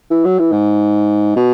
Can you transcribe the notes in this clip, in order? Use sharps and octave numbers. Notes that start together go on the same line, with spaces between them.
E3
F#3
E3
G#2
B2